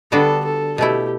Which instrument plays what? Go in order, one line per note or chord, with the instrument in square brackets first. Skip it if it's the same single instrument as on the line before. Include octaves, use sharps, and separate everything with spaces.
[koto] D3 G3 B3 D4 F#4 [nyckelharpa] A4
[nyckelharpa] A4
[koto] B2 A3 E4 [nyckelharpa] G4